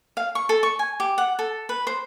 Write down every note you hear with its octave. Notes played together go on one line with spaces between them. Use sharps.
F5
C#6
A4
C#6
G#5
G4
F#5
A4
B4
C5